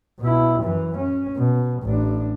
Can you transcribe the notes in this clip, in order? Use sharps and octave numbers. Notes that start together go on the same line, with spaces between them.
B2 E4
F#2 E3
C#4
B2
A1 D4